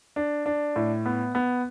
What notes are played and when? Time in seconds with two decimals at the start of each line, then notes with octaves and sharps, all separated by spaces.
0.16 D4
0.46 D4
0.76 A2
1.06 B3
1.35 B3